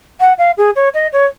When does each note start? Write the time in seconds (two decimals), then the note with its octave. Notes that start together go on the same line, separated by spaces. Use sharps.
0.20 F#5
0.38 F5
0.57 G#4
0.76 C#5
0.94 D#5
1.13 C#5